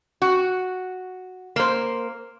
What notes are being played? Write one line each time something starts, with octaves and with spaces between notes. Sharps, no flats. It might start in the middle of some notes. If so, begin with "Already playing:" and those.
F#4
A#3 C5